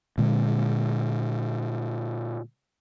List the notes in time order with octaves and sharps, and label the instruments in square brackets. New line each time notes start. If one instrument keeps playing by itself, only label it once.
[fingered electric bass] A#2 D3 G#3